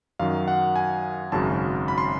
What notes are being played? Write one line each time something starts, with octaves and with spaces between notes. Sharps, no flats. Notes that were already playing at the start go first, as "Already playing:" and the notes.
F#2 D#3 F#3 F5
F#5
G#5
G#1 F#2 C#3 F#3 A5
B5
C6